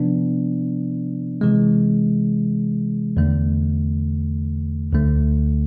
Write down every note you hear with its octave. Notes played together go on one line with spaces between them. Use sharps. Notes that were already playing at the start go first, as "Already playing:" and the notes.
Already playing: C3 F3 B3 D4
C3 E3 G#3
E2 D3 A3
D2 D3 A3